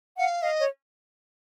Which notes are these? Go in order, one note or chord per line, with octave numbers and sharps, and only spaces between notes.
F5 F#5
D#5 F5
C#5